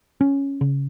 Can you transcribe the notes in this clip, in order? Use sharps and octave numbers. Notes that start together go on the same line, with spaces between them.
C#4
C#3